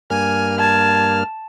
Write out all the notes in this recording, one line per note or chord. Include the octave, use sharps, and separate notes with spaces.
G2 A#3 G#5 F6
A5 G#6